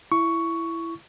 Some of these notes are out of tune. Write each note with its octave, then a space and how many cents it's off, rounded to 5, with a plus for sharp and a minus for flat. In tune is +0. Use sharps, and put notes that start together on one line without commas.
E4 +10 C#6 +10